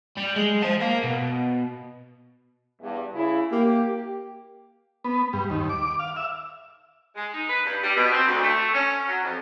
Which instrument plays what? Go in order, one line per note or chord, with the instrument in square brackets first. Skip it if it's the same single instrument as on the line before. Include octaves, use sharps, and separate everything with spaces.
[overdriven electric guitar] G3
G#3
C5 A5
A#4 F5
B2
[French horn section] E2 G2
C#3 E4
[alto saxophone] A#3 [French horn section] G4
[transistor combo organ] B3
G2
D#2
D6
F5
E5
[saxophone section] G#3
D#4
B4
G2
G3
B2
C4
D2
A3
C#4
F#3
F2